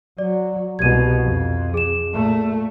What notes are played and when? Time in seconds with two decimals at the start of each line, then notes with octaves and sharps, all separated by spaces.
0.18 F#3 D5
0.79 C2 B2 G#6 D#7
1.23 F2
1.74 G#4 E7
2.14 A#2 A3